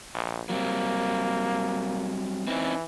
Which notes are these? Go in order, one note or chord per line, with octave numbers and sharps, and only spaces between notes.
A#1
F#3 G3 A#3 C4
E3 C4 C#4 D#4